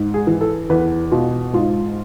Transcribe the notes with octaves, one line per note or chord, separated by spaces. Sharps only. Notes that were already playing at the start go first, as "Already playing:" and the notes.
Already playing: G#2
G#4
E3
A4
E2 B4
B2 F4
G#2 F4